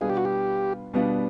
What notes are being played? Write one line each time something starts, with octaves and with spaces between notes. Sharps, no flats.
B2 G3 B3 D4 F4 G#4
G4
F#4
G4
B2 G3 B3 D4 F4